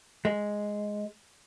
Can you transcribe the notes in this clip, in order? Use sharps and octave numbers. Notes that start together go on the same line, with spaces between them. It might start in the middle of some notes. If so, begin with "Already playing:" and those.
G#3